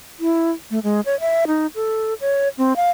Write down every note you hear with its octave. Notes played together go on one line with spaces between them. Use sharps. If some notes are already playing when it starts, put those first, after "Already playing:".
E4
A3
G#3
C#5
E5
D#4
A4
C#5
C4
F5